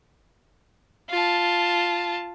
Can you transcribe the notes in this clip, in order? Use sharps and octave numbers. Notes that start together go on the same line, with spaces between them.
F4 A5